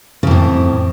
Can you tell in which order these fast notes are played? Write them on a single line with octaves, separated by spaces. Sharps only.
C#3 F2 A2